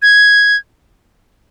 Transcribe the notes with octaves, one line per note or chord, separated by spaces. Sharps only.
G#6